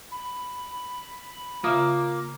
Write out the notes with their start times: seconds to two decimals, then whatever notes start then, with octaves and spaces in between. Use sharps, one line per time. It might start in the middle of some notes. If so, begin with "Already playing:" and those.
0.12 B5
1.64 C#3 A#3 F4 E5 D6 D#6